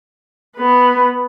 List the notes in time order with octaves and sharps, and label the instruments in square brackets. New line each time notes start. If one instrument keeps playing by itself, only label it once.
[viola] B3 B4